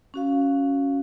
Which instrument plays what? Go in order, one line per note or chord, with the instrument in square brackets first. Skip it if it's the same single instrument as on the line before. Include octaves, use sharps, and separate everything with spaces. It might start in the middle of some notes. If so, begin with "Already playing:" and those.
[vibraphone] C#4 F#4 F5